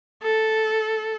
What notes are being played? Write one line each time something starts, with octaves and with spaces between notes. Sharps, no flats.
A4